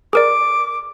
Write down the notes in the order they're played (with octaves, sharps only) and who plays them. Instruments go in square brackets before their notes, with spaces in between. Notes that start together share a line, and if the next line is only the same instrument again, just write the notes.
[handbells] G#4 A#4 D5 [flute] D6